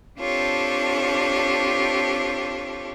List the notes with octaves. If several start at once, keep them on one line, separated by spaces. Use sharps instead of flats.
C4 D4 F4 G4 A4 C#5